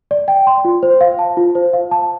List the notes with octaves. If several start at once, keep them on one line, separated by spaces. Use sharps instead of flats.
D5
G5
C6
F4
C5
F5
A5
F4
C5
F5
A5